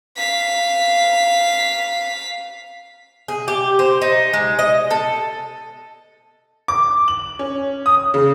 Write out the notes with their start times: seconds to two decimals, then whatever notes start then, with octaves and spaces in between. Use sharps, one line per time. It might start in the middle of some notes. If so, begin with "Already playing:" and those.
0.17 F5 B6
3.28 G#4
3.48 G4
3.79 C5
4.02 D#4
4.34 G#3
4.59 D#5
4.91 A4
6.68 D6
7.08 F#7
7.39 C#4
7.86 D#6
8.14 C#3